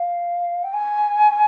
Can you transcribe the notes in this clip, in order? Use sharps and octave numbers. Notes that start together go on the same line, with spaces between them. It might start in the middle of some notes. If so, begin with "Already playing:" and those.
Already playing: F5
G5
G#5